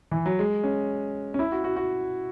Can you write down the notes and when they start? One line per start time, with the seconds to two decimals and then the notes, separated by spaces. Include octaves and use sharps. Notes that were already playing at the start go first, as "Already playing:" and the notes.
0.11 E3
0.26 F#3
0.39 G#3
0.64 C#4
1.34 C#4
1.39 E4
1.52 F#4
1.64 F#4
1.76 F#4